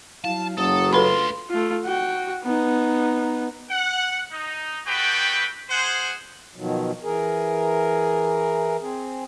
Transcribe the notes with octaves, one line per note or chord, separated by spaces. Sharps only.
F#3 E4 F5 A5
F#1 F#3 A4 D#6
D2 F4 A4 B4 B5 C6
A3 F4
F#4 G5
B3 D#4
F#5
D#4
A3 B3 F#4 G4 B4 G5
G#4 C5 F#5
B2 D#3 F3 F#3
E3 G#4 A#4
C4 G#4